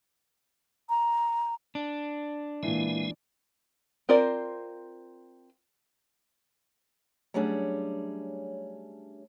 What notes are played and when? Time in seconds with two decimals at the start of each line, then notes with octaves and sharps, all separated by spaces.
0.89 A#5
1.75 D4
2.63 A#2 E3 G#3 E4
4.09 C4 F4 A#4 C5 D5
7.34 F#3 G3 A3 C#4 D4 G#4